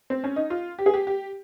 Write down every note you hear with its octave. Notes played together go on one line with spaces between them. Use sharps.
C4
C#4
D#4
F4
G4
G#4
G4
G4